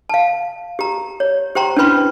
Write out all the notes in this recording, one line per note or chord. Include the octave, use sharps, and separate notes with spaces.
F5 A5
G4 A#5
C#5
G4 C5 G5 A#5 C6
C#4 D4 E4 B4 B5 C6